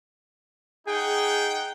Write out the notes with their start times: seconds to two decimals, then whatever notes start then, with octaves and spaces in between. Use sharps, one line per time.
0.87 D#4 G#4 F#5 G5